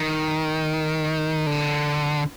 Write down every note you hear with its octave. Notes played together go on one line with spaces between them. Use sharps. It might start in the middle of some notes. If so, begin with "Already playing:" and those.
Already playing: D#3
D3